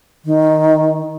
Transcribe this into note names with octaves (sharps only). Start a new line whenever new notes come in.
D#3